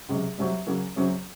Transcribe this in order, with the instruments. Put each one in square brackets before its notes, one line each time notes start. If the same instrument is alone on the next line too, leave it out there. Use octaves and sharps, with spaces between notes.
[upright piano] C#2 C3 F#3
C2 C3 F#3 C4 F#4
C#3 F#3 A#3 C#4 F#4
F#2 C#3 F#3 C4 F#4